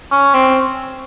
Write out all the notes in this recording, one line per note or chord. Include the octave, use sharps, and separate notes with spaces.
C#4
C4